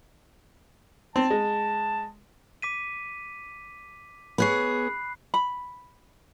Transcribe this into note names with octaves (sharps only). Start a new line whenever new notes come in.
C4 A5
G#3
D6 B6 D#7
B3 G#4 C#5 B5 F#6 C7
B5